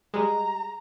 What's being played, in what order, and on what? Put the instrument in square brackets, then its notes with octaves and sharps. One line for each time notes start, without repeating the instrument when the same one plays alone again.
[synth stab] G3 G#3 [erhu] A#5